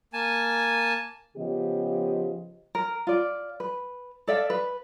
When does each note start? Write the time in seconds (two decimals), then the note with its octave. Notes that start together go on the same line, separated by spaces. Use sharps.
0.13 A#3 G#5 A5
1.37 C#3 F3 B3 G4 D#5
2.75 A#4
3.07 F4 D5
3.60 B4
4.27 A4 D5 E5 F5
4.50 B4